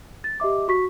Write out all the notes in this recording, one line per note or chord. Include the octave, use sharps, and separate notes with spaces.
A6
G4 D#5 E5 D6
F#4 C#6 B6